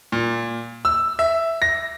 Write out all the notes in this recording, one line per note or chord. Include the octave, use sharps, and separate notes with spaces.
A#2
E6
E5
A#6